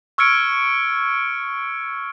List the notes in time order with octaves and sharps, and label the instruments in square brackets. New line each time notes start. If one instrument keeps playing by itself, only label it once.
[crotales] C#6 E6 F6 G#6 C#7 D7